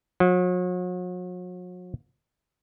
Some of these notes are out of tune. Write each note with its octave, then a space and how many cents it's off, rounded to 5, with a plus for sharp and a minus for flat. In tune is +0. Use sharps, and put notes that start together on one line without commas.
F#3 -40